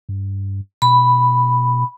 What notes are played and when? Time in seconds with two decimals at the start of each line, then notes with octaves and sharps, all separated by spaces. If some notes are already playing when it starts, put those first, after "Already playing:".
0.09 G2
0.82 B2 B5